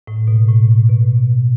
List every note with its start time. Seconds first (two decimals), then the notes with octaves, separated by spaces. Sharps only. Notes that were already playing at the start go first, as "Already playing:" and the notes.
0.07 A2
0.28 B2
0.49 A2
0.69 A2
0.89 B2